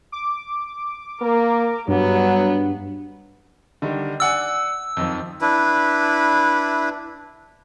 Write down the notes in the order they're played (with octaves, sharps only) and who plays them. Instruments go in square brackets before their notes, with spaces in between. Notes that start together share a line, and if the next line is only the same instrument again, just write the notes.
[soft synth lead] D6
[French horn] A#3 [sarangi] A#4
[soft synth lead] G2 [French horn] F#3 [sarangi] B3
[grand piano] D3 D#3 G3
[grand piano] D5 F#5 G#5 [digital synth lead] E6
[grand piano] F2 D#3 F3
[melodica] D4 E4 B4